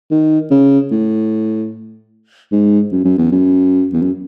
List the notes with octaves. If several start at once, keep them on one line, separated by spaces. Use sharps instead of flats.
D#3
C#3
A2
G#2
F#2
F#2
E2
F#2
E2
F#2